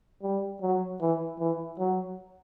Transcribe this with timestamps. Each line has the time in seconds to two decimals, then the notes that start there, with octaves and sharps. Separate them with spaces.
0.22 G3
0.61 F#3
1.01 E3
1.39 E3
1.79 F#3